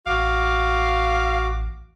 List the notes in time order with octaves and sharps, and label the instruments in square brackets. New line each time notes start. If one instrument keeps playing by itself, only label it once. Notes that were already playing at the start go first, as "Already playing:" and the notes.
[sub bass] A1 [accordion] F#4 D6 [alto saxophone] F5